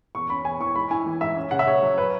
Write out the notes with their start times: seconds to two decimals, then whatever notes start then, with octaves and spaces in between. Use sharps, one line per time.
0.15 E2 C#6
0.30 C#4 B5
0.45 E2 G#5
0.60 E3 C#6
0.75 G#2 B5
0.91 E4 G#5
1.06 E3
1.21 G#2 E5
1.36 C#4
1.51 C#3 F#5
1.59 E5
1.67 C#3 C#5
1.82 F#3
1.98 B4